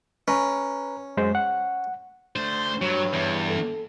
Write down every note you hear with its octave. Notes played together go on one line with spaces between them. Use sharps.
C#4 B4 A#5
F#2 G#3 C5
F#5
A3 D4 C5
G2 F#3 C#5
E2
A4